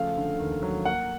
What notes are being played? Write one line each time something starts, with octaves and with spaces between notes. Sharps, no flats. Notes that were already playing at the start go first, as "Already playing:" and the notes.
Already playing: C#3 F3 A3 F5
D3
D#2
F#3
A#3 F#5